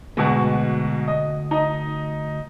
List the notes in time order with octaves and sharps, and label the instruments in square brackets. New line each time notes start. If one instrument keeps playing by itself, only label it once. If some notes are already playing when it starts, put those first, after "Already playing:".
[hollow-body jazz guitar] D2 [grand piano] G#2 B2 F#4
[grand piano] D#5
D#4 D#5